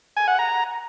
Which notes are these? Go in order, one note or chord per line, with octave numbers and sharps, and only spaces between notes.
G#5
F#5
A#5